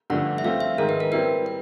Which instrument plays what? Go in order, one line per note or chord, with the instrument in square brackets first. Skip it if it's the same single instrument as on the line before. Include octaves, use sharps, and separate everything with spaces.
[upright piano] G2 D3 F3 A3 [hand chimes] F#5
[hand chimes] E5
[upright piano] F3 A3 C4 [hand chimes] F5
[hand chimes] E5
[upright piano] G#2 D#3 G#3 [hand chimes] A#4
[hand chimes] B4
A#4
[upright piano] G3 C4 E4 [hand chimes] B4
[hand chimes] B4